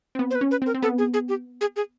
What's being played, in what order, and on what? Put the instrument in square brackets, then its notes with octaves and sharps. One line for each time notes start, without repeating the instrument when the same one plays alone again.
[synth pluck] C4
B3
[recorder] C5
B4
[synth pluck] C#4
[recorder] B4
[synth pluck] C4
[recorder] A#4
[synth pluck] C4
[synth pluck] B3 [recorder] A4
[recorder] G#4
G#4
G4
G#4
G#4